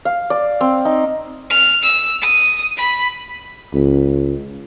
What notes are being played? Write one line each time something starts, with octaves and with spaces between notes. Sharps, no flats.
F5
D5
C4
D#4
F6
E6
D#6
B5
C#2